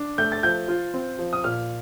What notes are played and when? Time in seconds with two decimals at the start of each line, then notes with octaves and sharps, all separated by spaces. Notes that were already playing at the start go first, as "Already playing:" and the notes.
Already playing: D4
0.18 A3 G6
0.32 A6
0.43 F3 G6
0.68 F4
0.94 C4
1.19 F3
1.33 D#6
1.44 A#2 F6